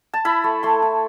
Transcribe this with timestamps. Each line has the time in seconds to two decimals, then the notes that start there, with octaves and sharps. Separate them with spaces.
0.14 A5
0.25 E4 B5
0.44 A3
0.63 A3 C6
0.82 E4